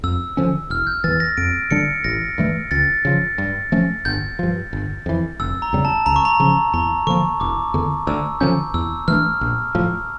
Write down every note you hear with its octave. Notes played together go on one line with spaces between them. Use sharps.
F2 E6
D3 F3 C#4
E1 F6
G6
E2 E3 A6
A#6
F2 D7
D3 G3 D4 C#7
A1 A#6
G2 E3 A3
C#2 A6
C#3 F3
G2
F3 A3 C#4
G1 G6
G2 F3
G1
F2 E3
F1 E6
A#5
E2 C#3 G3
A5
C#2 A#5
C#6
A#5
C#3 F3 C#4 A#5
E2 A#5
D3 F3 A#3 C#6
E1 D6
E2 D3
D2 E6
D3 F3 C#4 G6
E2 E6
E3 A3 D4 F6
A#1
A2 F3